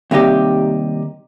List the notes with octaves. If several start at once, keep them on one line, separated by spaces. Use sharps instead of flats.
D#2 C3 G3 D#4 G4